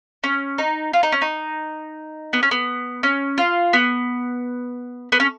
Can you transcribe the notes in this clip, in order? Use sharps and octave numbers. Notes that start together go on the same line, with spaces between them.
C#4
D#4
F4
D#4
C#4
D#4
B3
C#4
B3
C#4
F4
B3
B3
C#4